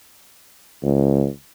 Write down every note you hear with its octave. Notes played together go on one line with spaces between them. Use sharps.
C#2